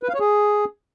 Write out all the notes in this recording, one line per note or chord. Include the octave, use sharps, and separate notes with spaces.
B4
F5
C#5
G#4